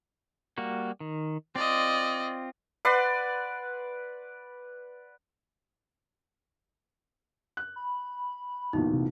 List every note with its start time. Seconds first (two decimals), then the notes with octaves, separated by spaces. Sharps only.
0.58 G3 A#3 F#4
1.00 D#3
1.56 C4 F4 D5 D#5
2.85 B4 D5 F#5 C6
7.57 F#6
7.76 B5
8.73 B1 E2 A#2 D#4
8.93 C3